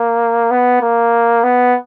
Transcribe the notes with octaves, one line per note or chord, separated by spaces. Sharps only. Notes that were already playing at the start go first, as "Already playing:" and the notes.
Already playing: A#3
B3
A#3
B3